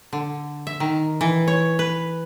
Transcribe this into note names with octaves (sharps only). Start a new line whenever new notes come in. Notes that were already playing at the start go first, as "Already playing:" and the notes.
D3
E5
D#3
E3
C#5
B4